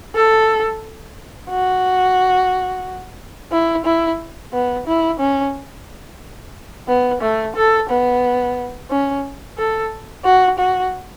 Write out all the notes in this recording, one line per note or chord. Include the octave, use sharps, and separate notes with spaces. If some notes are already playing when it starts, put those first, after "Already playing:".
A4
F#4
E4
E4
B3
E4
C#4
B3
A3
A4
B3
C#4
A4
F#4
F#4